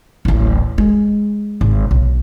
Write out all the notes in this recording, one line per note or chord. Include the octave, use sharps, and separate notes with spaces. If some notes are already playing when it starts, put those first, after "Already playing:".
D1 A1
G#3
G#1
B1